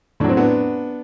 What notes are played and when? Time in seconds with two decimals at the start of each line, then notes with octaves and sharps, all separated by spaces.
0.20 A2 D4
0.24 F#3 C4
0.37 B3 D4